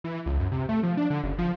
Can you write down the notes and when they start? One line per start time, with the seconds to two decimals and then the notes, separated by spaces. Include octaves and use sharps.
0.04 E3
0.26 C#2
0.40 F#2
0.52 C3
0.69 A3
0.83 F3
0.97 D4
1.10 D3
1.23 F#1
1.38 F3